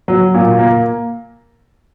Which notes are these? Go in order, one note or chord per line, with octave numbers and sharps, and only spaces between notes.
F#3
A#2
A#3